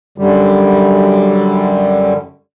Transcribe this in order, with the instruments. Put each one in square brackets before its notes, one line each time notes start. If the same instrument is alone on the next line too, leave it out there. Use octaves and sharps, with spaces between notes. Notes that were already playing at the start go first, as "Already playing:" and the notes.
[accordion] F#2 D3 G3